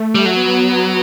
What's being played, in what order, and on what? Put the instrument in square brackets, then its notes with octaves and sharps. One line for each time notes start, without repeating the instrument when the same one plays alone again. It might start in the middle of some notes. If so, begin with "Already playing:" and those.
Already playing: [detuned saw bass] A3
[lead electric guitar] G3
F#3
[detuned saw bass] B3